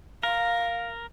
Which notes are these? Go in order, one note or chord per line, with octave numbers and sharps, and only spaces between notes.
A#4 F5